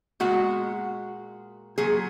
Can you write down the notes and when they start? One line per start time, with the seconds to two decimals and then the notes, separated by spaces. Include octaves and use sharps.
0.20 A#2 G#3 F#4
1.78 A#2 F#3 G#4